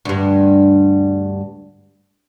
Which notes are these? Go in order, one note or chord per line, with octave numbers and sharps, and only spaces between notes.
D2 G2